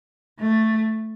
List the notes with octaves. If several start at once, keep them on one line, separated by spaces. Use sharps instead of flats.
A3